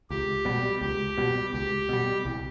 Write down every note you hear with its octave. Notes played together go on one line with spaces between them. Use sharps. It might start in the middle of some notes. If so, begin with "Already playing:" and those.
C#2 G4
B2 G3
C#2 G4
B2 G3
C#2 G4
B2 G3
C2